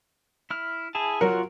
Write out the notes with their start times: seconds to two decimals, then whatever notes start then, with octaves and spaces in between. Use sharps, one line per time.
0.50 E4 F6
0.95 E4 G#4 A5
1.21 F#3 F4 F#4 A#4 F#5